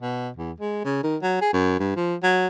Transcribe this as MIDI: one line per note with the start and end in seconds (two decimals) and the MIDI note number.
0.02 0.29 47
0.37 0.52 40
0.60 0.81 56
0.85 1.02 49
1.03 1.17 51
1.22 1.40 54
1.41 1.50 68
1.53 1.79 42
1.80 1.96 43
1.97 2.15 53
2.23 2.48 54